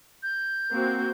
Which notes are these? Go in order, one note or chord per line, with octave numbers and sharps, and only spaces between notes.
G6
A#3 C4 F#4